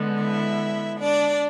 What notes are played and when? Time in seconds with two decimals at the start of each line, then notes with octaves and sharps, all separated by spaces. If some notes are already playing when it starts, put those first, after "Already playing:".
Already playing: D3 G#3 B3
0.21 E4 E5
0.99 D4 D5